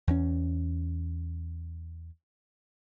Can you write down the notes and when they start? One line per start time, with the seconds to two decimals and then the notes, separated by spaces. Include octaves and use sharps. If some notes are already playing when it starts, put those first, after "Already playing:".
0.07 E2 C#4